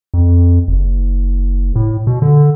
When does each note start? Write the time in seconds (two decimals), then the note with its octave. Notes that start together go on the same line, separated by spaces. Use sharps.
0.14 F2
0.68 F#1
1.76 A2
2.07 B2
2.22 D3